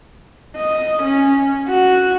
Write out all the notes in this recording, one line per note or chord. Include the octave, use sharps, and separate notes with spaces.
D#5
C#4
F#4